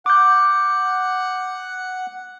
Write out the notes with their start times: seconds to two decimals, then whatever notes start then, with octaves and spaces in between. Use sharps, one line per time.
0.06 F#5 D6 G6